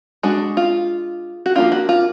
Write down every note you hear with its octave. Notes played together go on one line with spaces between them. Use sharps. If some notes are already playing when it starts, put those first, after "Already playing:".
G#3 D4 F#4
F4
F#4
F3 A#3 D4 F4
F#4
F4